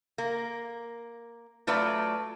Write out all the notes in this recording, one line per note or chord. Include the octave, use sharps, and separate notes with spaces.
A#3
F#3 A3 F4 B4 D5 E5